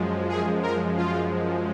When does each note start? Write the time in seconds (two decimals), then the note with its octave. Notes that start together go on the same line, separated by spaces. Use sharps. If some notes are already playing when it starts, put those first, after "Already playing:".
Already playing: F#2 F3 G#3
0.29 G#4
0.63 A#4
0.97 F4